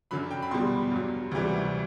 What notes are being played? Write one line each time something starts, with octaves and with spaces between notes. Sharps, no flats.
F#2 D3 F#3 B5
G5
B5
E2 B2 G3 C6
G2 F#3
D2 C3 E3 G3